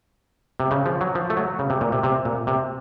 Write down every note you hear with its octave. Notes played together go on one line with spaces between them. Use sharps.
C3
C#3
F3
F#3
F3
A3
F#3
C#3
C3
A#2
C3
C3
A#2
C3